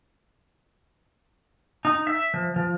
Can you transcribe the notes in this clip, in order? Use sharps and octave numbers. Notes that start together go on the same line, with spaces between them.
D#4
E5
F3
F3